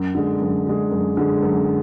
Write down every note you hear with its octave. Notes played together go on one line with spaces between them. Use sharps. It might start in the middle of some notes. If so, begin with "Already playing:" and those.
Already playing: F#2
D3 G#3
F#2
D3 G#3
F#2
D3 G#3
F#2